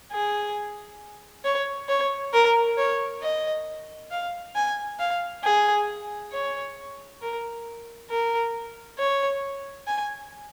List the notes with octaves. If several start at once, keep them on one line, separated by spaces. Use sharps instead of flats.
G#4
C#5
C#5
A#4
C#5
D#5
F5
G#5
F5
G#4
C#5
A#4
A#4
C#5
G#5